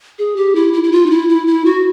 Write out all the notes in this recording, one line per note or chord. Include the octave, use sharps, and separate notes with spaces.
G#4
G4
E4
E4
E4
F4
D#4
E4
E4
E4
F#4